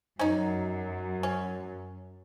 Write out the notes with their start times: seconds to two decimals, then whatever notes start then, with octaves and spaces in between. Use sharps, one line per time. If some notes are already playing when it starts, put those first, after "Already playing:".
0.19 F#2 C#4 D#4
1.23 C#4